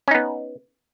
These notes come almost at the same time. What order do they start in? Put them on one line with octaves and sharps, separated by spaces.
C#4 D#4 B3